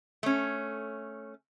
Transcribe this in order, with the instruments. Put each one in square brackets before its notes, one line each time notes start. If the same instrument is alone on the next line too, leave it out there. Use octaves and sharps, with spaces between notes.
[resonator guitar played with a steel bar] A3 C#4